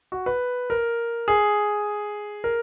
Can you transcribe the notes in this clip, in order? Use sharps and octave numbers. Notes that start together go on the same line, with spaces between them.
F#4
B4
A#4
G#4
A#4